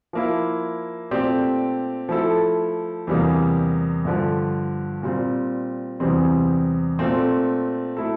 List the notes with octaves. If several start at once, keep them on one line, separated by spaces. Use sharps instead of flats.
F3 A#3 E4
A#2 A3 C4 G4 D5
F3 A3 E4 A4
E2 C3 G3 A#3
G2 D3 F3
A#2 G3 C4
E2 C3 G3 C4
A#2 A3 C4
A3 E4 A4